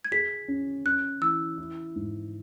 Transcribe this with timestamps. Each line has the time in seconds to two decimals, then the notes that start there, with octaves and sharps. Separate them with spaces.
0.05 G#6
0.12 G#4 B6
0.48 C#4
0.85 C#4 F#6
1.21 E3 E6
1.58 E4
1.96 G#2